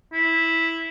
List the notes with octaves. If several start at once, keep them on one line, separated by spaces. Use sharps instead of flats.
E4